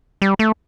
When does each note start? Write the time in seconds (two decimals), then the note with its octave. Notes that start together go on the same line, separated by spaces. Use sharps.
0.22 G3
0.39 A3